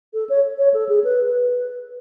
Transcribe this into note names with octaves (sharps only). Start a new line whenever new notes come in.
A4
C#5
C#5
A4
G#4
B4
B4